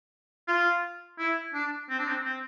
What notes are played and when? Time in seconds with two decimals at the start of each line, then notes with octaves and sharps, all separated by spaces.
0.48 F4
1.19 E4
1.54 D4
1.89 C4
1.99 D4
2.09 C4
2.25 C4